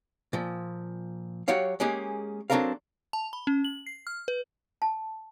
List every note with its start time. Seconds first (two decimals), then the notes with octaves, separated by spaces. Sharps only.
0.33 A#2 F3
1.48 F#3 F#4 G4 C#5 F5
1.80 G#3 A#3 C#4 G4 G#4
2.50 F#3 C4 D4 A4 A#4 F5
3.13 A5
3.33 B5
3.47 C#4
3.64 F#7
3.86 C7
4.07 F6
4.28 B4
4.82 A5